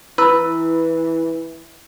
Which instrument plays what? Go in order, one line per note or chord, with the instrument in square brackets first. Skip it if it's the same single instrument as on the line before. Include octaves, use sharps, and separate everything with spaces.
[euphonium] E3 [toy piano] E4 E6 [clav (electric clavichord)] B4